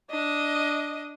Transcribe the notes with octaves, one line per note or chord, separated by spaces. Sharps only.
D4 D#5